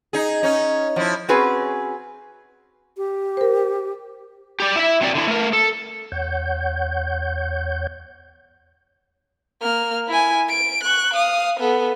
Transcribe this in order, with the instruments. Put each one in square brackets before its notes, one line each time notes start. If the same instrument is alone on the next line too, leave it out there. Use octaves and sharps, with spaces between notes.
[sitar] D#4 G#4
C#4 D#4
F3 E4
[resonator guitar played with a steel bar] C4 C#4 F#4 G#4 B4
[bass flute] G4
[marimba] A#4 C5
[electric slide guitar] G4 D5
E4 E5
F#3 C4 D5
D3 E4
A3 A#4
A4
[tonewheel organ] E2 C#5 F#5 G6
[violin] A#3 F6
E4 G#5
D7
C#6 F#6
F5 D#6
B3 A4